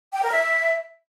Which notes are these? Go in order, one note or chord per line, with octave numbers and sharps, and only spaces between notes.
G5
A#4
E5